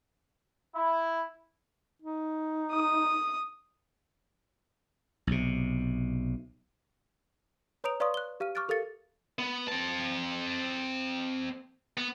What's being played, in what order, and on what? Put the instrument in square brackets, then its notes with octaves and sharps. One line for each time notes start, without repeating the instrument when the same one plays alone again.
[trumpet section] E4
[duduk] D#4
[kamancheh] D#6
[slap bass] B1 C3
[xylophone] B4 C#5 A#5 D#6 D7 F7
B4 D5 F5 C6 C#6 D#6
F#6 G7
G4 F5 F6 D#7
C#6 D6 F6 F#6 A6 D7
G4 A4 A#4 F5 A6 C#7
[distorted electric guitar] B3
C4 A5
B3